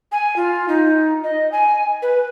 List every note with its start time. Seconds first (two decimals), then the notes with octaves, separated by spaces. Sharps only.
0.12 G#5
0.36 F4
0.68 D#4
1.23 D#5
1.52 G#5
2.02 B4